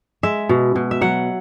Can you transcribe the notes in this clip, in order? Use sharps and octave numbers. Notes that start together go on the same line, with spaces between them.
G#3 E5
B2
B2
E5
F#3 F#5